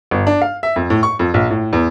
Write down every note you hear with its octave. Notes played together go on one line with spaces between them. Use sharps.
G1
D4
F5
E5
F2
A2
C#6
F2
A#1
A2
E2